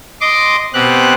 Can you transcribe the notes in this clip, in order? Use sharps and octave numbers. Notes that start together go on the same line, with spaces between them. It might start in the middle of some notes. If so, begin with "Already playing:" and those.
D#5 C6 D6
B2 C4 G4 F#6